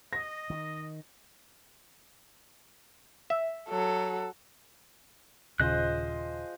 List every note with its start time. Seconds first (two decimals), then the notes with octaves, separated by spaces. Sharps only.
0.13 D#5 A#6
0.50 D#3
3.30 E5
3.69 F#3 A4
5.60 D#1 C#3 F3 G#3 C5 D#5 F#6